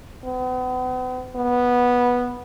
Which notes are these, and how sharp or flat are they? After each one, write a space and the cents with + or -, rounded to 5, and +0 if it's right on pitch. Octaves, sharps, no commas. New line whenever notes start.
B3 +40
B3 -10